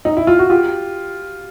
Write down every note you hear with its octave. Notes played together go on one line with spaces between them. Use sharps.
D#4
E4
F4
F#4
F4 G4